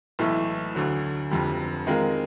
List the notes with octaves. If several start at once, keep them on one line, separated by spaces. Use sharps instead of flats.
B1 A2 E3 A3
D2 D3 F#3
F1 F2 D3 G3
D#3 G#3 C4 F4 A#4